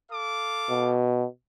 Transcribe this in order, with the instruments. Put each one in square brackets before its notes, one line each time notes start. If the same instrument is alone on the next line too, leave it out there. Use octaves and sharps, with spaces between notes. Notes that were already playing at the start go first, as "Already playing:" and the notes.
[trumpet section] A4 F5 D6
[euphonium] B2